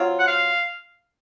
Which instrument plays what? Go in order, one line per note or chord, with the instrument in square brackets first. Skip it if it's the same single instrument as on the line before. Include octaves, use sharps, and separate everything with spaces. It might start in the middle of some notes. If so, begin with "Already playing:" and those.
Already playing: [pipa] F#3 C4 F4
[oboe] F#5
F5